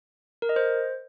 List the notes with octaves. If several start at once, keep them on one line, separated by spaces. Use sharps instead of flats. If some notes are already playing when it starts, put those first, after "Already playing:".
A#4
D#5
C5